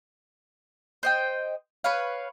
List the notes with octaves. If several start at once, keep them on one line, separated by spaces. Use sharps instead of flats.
C5 D#5 G5
B4 C#5 F5